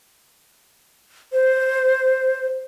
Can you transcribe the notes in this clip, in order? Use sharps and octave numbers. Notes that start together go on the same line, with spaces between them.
C5